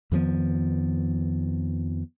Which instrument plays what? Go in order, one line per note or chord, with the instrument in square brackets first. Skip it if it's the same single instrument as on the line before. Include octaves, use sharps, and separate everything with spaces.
[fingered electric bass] F2 D#3 F3 B3